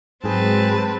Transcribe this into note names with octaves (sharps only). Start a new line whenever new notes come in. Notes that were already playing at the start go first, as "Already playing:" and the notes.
G#2 F#3 G#3 C4 G#4 B4 A5